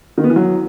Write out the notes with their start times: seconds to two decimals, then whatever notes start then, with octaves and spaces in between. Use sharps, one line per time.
0.18 D#3
0.24 B3
0.30 E3
0.36 F#3